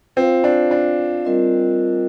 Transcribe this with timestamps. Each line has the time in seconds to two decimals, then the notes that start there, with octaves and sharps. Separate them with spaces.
0.16 C4 F4 C5 F5
0.44 D4
0.71 D4
1.25 G3 C4 F4 A#4 D#5